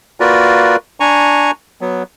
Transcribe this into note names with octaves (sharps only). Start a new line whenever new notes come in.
A#3 F4 F#4 A#4 B4 D5
D4 G#5 A#5 C#6
F#3 B3